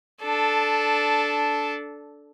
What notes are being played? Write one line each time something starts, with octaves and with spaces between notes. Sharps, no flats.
D4 A4